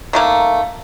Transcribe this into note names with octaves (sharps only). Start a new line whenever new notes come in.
D#3 A3 A#3